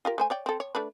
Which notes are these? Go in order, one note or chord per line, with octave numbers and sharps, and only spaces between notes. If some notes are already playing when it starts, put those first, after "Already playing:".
F4 G4 A#4
A3 C5 G#5
C#5 D5 G5
C4 A4
C#5
A3 D4 B4